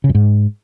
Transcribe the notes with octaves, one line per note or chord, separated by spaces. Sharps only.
C#3
F#2
G#2